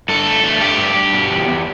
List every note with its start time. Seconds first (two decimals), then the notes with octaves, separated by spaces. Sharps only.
0.09 G2 A4
0.26 A3
0.44 G2
0.61 A3 G4
0.78 G2
0.96 G2
1.14 B2
1.31 E2
1.48 E2